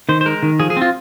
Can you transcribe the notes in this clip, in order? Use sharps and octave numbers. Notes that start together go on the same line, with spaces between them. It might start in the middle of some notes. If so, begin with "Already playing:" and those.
D#3 C5
C5
G#3 A#4
D#3
F3 G#4
G#4
C4 F4